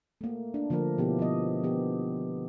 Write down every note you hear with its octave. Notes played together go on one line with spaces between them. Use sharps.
A3 A#3
D4
D3 F3 A3 A#3 A#4
B2 F3 B3 D#4 E4 G4
F3 B3 D#5
D#3 F3 B3 G4